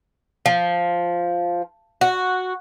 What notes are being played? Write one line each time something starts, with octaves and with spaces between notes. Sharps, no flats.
F3
F#4